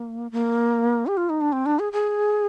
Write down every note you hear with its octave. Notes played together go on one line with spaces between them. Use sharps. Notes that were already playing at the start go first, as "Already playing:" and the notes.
Already playing: A#3
A#3
G4
F4
D#4
D4
C4
D4
G#4
G#4